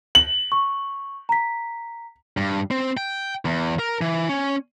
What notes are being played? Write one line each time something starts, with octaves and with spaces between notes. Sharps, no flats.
F#7
C#6
A#5 B6
G2
C4
G5
E2
A#4
E3
C#4